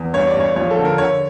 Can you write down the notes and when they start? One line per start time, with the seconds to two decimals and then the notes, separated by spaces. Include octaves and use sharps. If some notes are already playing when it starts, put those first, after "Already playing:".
Already playing: E2
0.14 G2 C#5
0.27 D5
0.36 G2 C#5
0.56 F3 C#5
0.71 A4
0.78 D3
0.85 A#4
0.98 D3 C#5